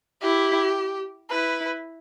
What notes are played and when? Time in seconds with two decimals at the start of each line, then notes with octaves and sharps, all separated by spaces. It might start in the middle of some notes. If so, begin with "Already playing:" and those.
0.21 E4 G4
1.30 E4 B4